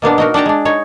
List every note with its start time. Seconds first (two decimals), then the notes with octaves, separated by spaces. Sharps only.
0.02 B2 A#3 B3 D4
0.18 D#4 F#4 A#4
0.34 D4 F#5 G5 A5 A#5
0.46 G#3 D4
0.65 D#4 C#5